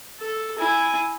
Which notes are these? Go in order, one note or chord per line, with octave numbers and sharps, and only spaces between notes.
A4
E4 G#5